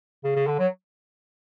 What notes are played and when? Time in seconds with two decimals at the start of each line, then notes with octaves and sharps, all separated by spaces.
0.24 C#3
0.35 C#3
0.47 D3
0.59 F#3